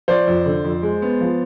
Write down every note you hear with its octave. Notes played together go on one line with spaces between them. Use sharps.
F3 C5 D5
F2
D3
F2
G#3
B3
F3